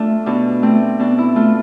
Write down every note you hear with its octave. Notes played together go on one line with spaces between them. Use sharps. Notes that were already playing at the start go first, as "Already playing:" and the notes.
Already playing: A3 D4 F4
B2 D4
A3 C4
B2 D4
E4
A3 F4